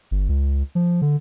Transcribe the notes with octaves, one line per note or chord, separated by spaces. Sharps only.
G1
C#2
F3
D3